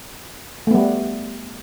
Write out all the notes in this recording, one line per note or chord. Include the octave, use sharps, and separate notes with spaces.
G3 A3 B3